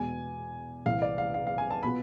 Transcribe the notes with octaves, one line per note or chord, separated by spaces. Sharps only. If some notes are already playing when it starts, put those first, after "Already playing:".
Already playing: E2 B2 G#3 G#5
C2 C3 E3 F5
D5
F5
F5
F5
G#5
A5
B2 B3 F4 B5